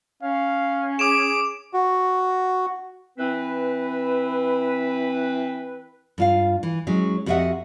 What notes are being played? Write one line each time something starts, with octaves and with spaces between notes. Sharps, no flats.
C#4 F5
G#4 D6 D7 E7
F#4
E3 C4 B4
G2 F4 F5
E3
F#3 G#3 C#4
F2 F#4 G4 D#5 E5 F#5